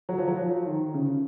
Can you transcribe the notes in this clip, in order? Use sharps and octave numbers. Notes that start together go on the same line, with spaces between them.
F#3
F3
F#3
F3
D#3
C#3